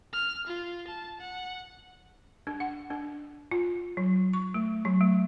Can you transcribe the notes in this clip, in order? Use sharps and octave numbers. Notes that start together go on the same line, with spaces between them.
F6
F4
A5
F#5
D4
F#5
D4
F4
F#3
C#6
A3
F#3
A3